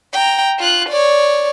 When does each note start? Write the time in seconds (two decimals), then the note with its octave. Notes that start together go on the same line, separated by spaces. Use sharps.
0.13 G5 A#5
0.59 F4 F#6
0.89 C#5 D5